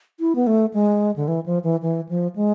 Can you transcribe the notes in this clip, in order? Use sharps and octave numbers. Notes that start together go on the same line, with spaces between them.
E4
B3
A3
G#3
D3
E3
F3
E3
E3
F3
G#3